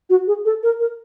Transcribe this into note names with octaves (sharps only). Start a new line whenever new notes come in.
F#4
G#4
A4
A#4
A#4